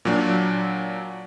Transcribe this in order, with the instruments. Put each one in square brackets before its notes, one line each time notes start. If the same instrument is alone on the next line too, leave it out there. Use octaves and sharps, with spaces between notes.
[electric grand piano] A#2 F#3 D4